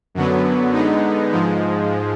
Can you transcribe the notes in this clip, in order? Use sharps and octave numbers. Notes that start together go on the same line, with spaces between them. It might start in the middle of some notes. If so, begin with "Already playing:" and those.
F#2 D3 F#3 B3
D3 G#3 B3 D#4
G#2 F3 G#3